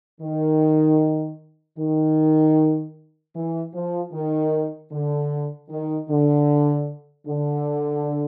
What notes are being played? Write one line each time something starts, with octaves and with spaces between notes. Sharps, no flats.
D#3
D#3
E3
F3
D#3
D3
D#3
D3
D3